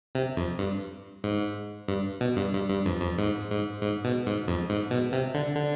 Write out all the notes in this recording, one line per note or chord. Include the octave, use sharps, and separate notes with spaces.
C3
F2
G2
G#2
G2
B2
G2
G2
G2
F2
F2
G#2
G#2
G#2
B2
G#2
F2
G#2
B2
C3
D3
D3